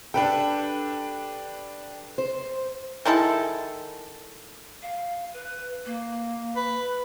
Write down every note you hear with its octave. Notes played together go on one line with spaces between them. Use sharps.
D4 G4 A4 B4 G5
C5
D#3 G#3 E4 A4
F5
B4
A#3
B4